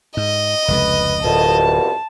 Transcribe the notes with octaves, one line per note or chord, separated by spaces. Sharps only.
G#2 D#5
F1 C#2 C3 B4
D1 C2 F2 B2 A5